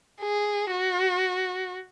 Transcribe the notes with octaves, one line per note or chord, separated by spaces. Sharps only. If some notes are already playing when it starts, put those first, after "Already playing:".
G#4
F#4